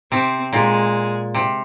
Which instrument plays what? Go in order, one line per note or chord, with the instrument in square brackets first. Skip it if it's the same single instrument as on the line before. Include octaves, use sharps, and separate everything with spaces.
[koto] C3 [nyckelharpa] C4
[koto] A#2 [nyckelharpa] G#3
[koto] C3